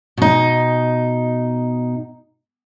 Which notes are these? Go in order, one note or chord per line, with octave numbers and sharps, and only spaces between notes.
B2 D#4